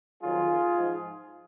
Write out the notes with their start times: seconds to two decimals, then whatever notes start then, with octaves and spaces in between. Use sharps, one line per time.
0.22 F2 D#3 F#3 F4 G#4
0.74 G#2 F3